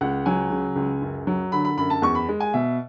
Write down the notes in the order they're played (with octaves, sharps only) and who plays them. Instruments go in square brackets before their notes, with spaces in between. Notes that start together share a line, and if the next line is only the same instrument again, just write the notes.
[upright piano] C#2 F#5
F#3 G#5
C#3
C#2
F#2
F#3
D3 B5
B5
F#2 B5
A5
E2 C#6
B5
G#3
G#5
B2 E5